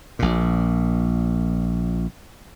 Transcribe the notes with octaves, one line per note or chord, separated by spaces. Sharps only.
A#1 A#2